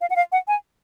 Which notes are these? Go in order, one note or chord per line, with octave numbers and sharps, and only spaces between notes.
F5
F#5
F5
F#5
G#5